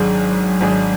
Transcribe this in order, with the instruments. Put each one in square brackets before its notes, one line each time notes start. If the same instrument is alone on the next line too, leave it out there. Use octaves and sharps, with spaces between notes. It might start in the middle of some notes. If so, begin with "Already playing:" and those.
Already playing: [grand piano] G#1 G#2 G#3 D4 G#4 [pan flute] F#3
[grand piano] G#1 G#2 G#3 D4 G#4